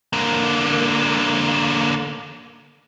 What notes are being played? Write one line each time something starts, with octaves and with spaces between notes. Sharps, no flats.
D3 A#3